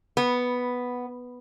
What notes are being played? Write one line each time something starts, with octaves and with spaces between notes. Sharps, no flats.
B3